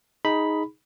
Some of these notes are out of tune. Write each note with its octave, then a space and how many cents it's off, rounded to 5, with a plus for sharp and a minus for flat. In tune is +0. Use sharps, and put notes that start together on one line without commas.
D#4 +10 G#4 +0 B5 +0